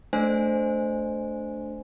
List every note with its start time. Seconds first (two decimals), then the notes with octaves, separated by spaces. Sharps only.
0.13 A3 D4 C5 G#5